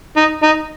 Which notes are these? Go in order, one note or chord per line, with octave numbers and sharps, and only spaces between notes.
D#4
D#4